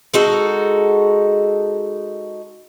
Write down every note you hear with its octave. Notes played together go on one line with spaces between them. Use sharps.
G#3 D#4 F#4 A4